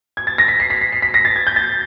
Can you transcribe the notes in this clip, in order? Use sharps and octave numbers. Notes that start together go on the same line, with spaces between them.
G#6
A6
A#6
B6
C7
B6
B6
C7
B6
A#6
A6
G#6
G6
A6